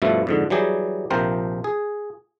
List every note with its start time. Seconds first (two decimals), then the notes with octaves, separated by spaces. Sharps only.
0.02 G2 B2 F3 A3 E4
0.27 F2 G#2 D3
0.50 E3 F#3 G3 G4 G#4
1.11 A#1 C3 F3 A#4 C5 G5
1.64 G#4